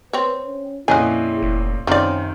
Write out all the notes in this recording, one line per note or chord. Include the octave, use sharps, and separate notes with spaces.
C4 B4 C#5
C#4
F2 A#2 C#4 E4 G#4 B4 D#5 G#5
F1
F#2 C3 D#3 F3 C#4 D5